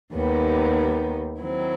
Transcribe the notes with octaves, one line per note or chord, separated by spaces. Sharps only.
D#2 D#3 G3 B3
D#3 F#3 C4 E4